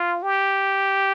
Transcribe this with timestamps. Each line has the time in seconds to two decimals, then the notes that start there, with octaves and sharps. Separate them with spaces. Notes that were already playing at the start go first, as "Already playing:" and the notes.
Already playing: F4
0.23 G4